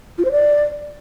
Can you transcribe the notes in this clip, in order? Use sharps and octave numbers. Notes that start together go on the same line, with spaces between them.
F4
C5
D5